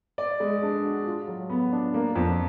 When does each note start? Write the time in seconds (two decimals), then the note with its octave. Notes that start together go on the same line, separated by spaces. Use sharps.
0.18 D5
0.40 G#3
0.62 D4
0.84 F#4
1.06 F4
1.28 F#3
1.50 B3
1.72 D4
1.94 A#3
2.15 F2